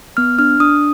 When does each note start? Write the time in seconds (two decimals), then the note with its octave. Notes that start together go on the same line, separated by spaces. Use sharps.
0.17 B3 F6
0.39 D4 F6
0.60 D4 D#6